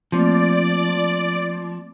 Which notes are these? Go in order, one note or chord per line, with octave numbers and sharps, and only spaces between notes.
F3 A3 A#3 C4 D5